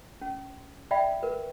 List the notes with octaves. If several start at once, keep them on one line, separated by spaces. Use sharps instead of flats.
C#4
D5 E5 F5 G5 B5
A#4 B4